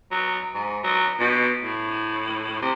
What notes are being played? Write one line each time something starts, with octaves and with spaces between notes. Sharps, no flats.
F#3
G#2
F#3
B2
A2
C3